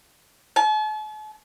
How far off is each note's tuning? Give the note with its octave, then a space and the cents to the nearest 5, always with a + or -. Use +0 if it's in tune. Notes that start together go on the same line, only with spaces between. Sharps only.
A5 -45